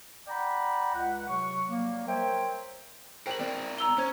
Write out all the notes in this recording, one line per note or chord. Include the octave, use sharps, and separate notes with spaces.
D5 F#5 G5 A#5 B5
C#2 F#5
C3 F#3 C#6
F#3 G3 A#3
A#4 C5 C#5 E5 G5
A#4 C5 G5 F#7
C4 A#4 D5
A#5 E6 G7
C#4 C5 G#6